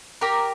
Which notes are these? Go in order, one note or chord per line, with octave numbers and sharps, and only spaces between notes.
G4 A#4